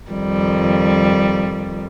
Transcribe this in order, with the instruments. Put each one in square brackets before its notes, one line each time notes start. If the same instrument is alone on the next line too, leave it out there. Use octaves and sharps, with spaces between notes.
[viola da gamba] F2 D#3 G3